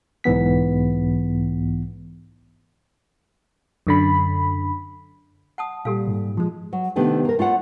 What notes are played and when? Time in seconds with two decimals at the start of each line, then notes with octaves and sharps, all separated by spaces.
0.24 B1 G#2 E3 B3 B6
3.87 F#2 D3 B5
5.58 F#5 A5 D#6
5.85 A#2 G3 G4 A4 F5
6.08 G#2
6.37 F3 G#3
6.73 F#3
6.96 C3 D#3 A3 B3 D4 G4
7.25 A#3 A#4
7.39 A3 F4 C#5 F#5